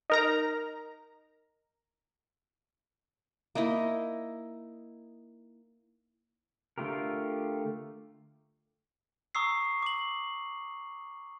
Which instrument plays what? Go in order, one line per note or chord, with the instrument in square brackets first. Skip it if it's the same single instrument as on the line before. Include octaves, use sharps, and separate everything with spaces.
[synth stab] D#4 A#4 A#5
[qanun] A#3 D#4 E4 D#5
[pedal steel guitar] D3 A3 F4 G4 A#4
[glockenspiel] A#5 C#6 D#6 E6 C7
D6 F#7